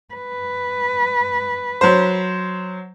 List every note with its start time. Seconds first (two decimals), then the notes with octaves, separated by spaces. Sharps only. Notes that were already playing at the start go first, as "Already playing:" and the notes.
0.14 B4
1.81 F#3 C5